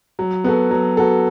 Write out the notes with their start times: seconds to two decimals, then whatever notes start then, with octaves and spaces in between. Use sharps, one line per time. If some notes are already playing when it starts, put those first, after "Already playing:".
0.19 F#3
0.44 B3 F#4 A4
0.71 F#3
0.97 B3 F#4 A4